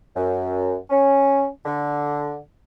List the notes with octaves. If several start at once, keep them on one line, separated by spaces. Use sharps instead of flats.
F#2
C#4
D3